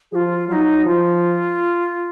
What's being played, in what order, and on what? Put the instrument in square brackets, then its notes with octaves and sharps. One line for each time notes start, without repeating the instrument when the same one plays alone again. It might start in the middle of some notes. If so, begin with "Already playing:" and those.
[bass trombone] F3 [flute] F4 G#4
[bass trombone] F#3 [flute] F4
[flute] D#4
[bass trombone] F3 [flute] F4